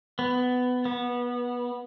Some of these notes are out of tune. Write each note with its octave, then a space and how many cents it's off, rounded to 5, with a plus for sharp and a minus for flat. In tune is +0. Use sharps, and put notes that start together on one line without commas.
B3 +15
B3 -20